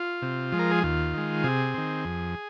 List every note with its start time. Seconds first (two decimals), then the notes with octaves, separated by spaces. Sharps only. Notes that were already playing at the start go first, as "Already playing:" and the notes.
Already playing: F4
0.22 C3
0.52 F3 G#3
0.59 A#4
0.71 G#4
0.83 D#2 F4
1.14 D#3 G#3
1.44 C3 G#4
1.74 D#3 C4
2.05 F2